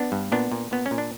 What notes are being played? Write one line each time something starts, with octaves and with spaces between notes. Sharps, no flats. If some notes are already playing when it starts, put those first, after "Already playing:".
Already playing: B3 D4
G2
A#2 B3 D4
A#2
A#2 B3
C#4
A#2
D4